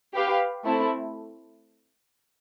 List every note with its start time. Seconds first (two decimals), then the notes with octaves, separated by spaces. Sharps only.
0.15 G4 B4 F5
0.65 A3 C4 E4 A4